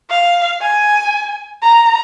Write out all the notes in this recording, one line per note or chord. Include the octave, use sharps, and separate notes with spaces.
F5
G#5
A#5